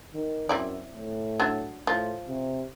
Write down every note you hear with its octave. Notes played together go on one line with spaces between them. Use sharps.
D#3
F#2 C4 E4 D5
A2
F#3 D4
A2 F3
C3